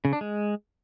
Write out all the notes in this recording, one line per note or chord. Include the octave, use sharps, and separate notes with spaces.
C#3
D4
G#3